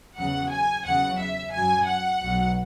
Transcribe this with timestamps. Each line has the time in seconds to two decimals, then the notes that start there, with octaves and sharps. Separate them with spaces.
0.18 E2 C#3 F#3 F#5
0.51 G#5
0.85 E2 C#3 F#3 F#5
1.19 E5
1.53 F#2 F#3 G#5
1.87 F#5
2.20 B1 B2 F#3